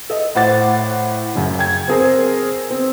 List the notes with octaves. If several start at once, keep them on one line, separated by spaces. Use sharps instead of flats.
A4 D#5
A2 C5 F#5 D6 A6
F#2 C#3
G5 G#6
C4 G#4 A#4 C5
C4